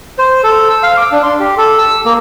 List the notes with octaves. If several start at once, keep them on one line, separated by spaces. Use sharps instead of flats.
C5
A4
E6
F5
D6
D4
C6
G4
A4
E6
A#3